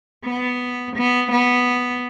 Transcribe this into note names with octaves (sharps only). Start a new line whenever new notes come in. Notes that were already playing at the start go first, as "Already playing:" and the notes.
B3
B3
B3